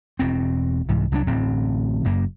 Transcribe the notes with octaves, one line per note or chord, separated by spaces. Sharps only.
E1 B2 C4
C2 G#2 E3
C2 F#3 G3 D4
D1 A1 C4
F#1 F#2 A#3